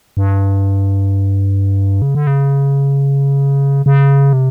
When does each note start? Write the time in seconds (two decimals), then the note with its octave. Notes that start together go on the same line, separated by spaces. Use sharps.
0.17 G2
2.02 C#3
2.15 D3
2.27 C#3
3.86 C#3
4.33 C3